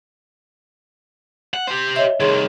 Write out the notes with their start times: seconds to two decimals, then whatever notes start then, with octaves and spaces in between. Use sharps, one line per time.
1.54 F#5
1.67 G4 C5
1.96 C#5 D#5 E5
2.20 C2 D#3 G#4 C#5 C6